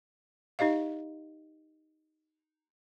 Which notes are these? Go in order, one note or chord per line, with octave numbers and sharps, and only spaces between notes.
D#4 G4 D#5 F5